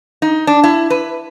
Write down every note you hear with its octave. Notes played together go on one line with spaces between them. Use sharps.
D#4
D4
E4
B4